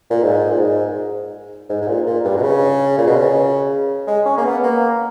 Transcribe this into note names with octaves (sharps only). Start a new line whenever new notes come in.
A#2
G#2
A#2
G#2
G#2
G#2
A#2
A#2
G2
B2
C#3
A#2
B2
C#3
G#3
C#4
A#3
B3
A#3